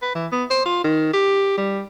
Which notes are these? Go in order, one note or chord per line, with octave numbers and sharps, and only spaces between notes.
B4
E3
B3
C5
F4
D#3
G4
G3